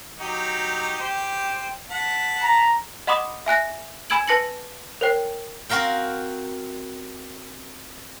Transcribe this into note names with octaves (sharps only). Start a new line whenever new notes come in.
F#3 D#4 G4
G4 C5 G5
F#5 A5 B6
A#5
D#5 F#5 B5 C6 D6 D#6
E5 G#5 F#6 A#6
G#5 B5 E6 G#6 D7 F#7
B4 A5 A#6 C#7 F#7
A#4 C5 C#5 G5
C4 F#4 A#4 F5 G5